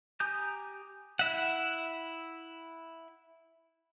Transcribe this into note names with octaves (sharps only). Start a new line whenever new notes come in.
G4 G#5 A#5 D#6 G6
E4 E5 F#5